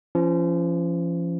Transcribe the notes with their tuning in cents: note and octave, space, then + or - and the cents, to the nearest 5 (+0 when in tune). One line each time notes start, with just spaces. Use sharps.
F3 -35 C#4 +0